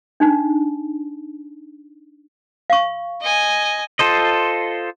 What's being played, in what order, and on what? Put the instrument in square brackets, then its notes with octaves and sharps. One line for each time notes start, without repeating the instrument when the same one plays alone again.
[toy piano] D4 D#4
F5 C#6
[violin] D#5 G#5
[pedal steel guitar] F4 A4 C5 D#5